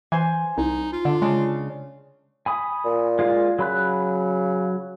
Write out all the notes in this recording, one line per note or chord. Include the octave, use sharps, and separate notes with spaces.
E3 C5 G#5
C2 D#4
F4
D3 D4
C#3 G#3 D4
G#5 B5 D#6
A#2
G#3 F4 F5
C#3 F#3 B5 F#6